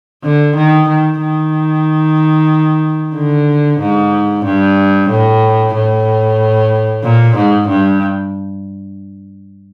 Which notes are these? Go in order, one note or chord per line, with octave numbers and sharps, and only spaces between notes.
D3
D#3
D#3
D#3
D3
G#2
G2
A2
A2
A#2
G#2
G2